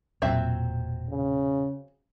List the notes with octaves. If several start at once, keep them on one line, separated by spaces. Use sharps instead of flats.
E1 A#2 F#3 C4 E5
C#3